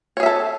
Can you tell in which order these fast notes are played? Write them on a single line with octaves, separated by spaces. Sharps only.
C#5 G#4 E5 A4